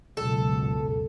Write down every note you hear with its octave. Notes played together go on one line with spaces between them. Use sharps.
C#2 F#2 B2 A4